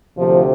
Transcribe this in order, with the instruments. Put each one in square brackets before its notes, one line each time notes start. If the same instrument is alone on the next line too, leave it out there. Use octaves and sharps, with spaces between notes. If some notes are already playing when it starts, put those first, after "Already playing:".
[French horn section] D2 C3 F3